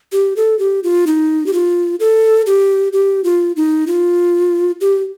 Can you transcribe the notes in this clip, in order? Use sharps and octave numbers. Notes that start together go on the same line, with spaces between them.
G4
A4
G4
F4
D#4
G4
F4
A4
G4
G4
F4
D#4
F4
G4